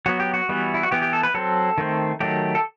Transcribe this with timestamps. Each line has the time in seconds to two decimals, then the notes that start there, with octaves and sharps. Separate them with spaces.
0.06 F#3 B3 F#4
0.20 G4
0.34 F#4
0.49 E3 G3 B3
0.74 E4
0.83 F#4
0.91 E3 B3 G4
1.02 G4
1.13 A4
1.23 B4
1.34 F#3 C4 A4
1.78 D#3 A3 C4
2.20 D#3 F#3 A3 G4
2.55 A4